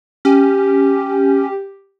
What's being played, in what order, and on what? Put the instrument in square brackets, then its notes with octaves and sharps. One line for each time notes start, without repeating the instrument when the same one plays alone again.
[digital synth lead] C#4 [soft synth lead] G4